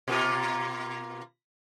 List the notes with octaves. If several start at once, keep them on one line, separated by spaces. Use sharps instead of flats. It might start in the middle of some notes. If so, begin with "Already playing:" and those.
B2 A#3 F4